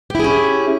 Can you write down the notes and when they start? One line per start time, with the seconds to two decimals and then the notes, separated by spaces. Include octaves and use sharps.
0.10 G4
0.15 E4
0.20 G#4
0.24 C#4